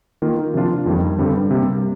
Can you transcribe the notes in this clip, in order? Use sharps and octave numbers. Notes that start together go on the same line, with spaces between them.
D#3 A#3 F4
C3 F3 A#3 D4 F4
F2 D#3 G3
G2 D3 G3 C4
C3 G3 A#3